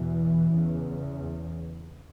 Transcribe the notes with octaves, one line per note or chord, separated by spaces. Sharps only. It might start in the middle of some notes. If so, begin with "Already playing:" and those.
Already playing: E2 B2 E3
E2 C#3